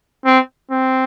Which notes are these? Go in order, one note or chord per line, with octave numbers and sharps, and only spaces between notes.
C4
C4